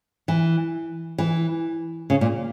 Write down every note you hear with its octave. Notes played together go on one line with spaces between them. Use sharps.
E3
E3
C#3
A#2